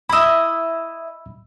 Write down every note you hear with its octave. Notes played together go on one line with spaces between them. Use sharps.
E4 D#5 B5 E6